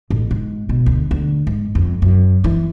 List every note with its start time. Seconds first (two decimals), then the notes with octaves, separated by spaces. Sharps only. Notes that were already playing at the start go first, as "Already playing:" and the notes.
0.10 A1
0.31 G#2
0.69 B2
0.86 D2
1.11 D2
1.47 G#2
1.75 F2
2.02 F#2
2.44 E3